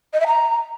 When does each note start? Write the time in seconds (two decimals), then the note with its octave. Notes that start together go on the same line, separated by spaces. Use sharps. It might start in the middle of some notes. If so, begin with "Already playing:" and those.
0.13 D#5
0.20 E5
0.27 A#5